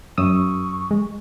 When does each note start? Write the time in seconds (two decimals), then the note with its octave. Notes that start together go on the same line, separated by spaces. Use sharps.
0.18 F#2 C#6 D#6 E6
0.91 G#3